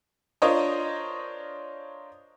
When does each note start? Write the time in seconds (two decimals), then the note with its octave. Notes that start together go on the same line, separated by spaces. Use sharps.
0.42 D4 F4 A#4 C5 C#5 D#5